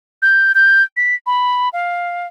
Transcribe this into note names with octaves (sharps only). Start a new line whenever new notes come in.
G6
G6
B6
B5
F5